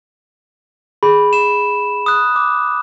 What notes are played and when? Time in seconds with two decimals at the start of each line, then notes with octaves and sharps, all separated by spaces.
1.03 G#4 B5
1.33 E7
2.06 D#6 F#6
2.36 D6